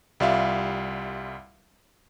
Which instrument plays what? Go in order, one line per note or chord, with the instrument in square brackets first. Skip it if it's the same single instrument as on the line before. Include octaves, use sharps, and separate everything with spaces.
[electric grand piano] C2 G3 F4 E5 F5